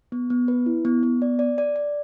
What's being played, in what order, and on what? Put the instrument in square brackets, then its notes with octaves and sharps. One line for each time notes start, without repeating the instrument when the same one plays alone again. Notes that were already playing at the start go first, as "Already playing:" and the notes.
[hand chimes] B3
B3
B4
E4
B3
B3
D5
D5
D5
D5